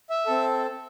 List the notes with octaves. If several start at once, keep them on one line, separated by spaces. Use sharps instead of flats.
E5
C4 A4